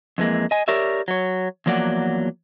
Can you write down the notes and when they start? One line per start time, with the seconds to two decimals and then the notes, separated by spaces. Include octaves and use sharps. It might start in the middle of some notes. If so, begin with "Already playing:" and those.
0.18 F2 E3 G#3 A#3
0.51 D#5 G#5
0.68 G4 A#4 C#5 D5 E5
1.08 F#3 C#5
1.66 E2 F3 F#3 A#3 D5 F#5